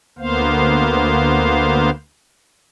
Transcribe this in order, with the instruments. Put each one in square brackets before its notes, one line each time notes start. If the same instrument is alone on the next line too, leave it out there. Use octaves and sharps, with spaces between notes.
[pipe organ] D2 A#3 B3 C5 F5